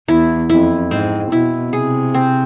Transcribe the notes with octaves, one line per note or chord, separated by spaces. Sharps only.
E2 E4
F2 E4
G#2 C4
B2 E4
C3 G#4
C4